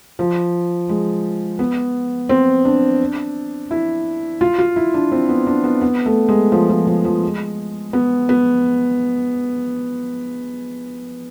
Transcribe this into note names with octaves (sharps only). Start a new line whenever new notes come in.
F3
G#3
B3
C4
D4
E4
F4
F4
E4
D4
C4
B3
D4
B3
B3
A3
G#3
F3
F3
F3
F3
G#3
B3
B3